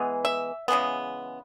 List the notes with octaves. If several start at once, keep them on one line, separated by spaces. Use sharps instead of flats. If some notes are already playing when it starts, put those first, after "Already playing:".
Already playing: E3 G#3 B3
E5
C#3 E3 G#3 B3